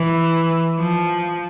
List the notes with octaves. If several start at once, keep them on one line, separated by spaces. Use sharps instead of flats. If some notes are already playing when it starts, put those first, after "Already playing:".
Already playing: E3
F3